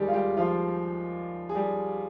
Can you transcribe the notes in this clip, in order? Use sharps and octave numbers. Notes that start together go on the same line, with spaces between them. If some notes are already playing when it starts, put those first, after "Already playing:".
Already playing: D#2 D#3 G3 G#3 G4 G#4
F4
G3 G4
F3 F4
G#4
G3 G4